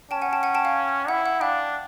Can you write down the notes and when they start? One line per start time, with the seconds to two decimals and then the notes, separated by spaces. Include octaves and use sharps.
0.11 C#4 G5 A5
0.22 F#5 G#5
0.33 G5 A5
0.43 F#5 G#5
0.55 G5 A5
0.65 F5 G5
1.08 E4 F#5
1.26 F#5
1.41 D4 F5 G5